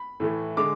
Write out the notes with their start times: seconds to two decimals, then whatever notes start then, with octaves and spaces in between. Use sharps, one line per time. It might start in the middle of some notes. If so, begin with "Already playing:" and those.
Already playing: B5
0.20 A2 E3 A3
0.57 D3 G#3 D6